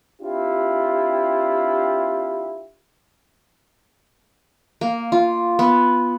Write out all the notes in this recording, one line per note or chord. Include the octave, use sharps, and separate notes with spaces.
C4 D4 E4 F4 G4
A#3
F4
B3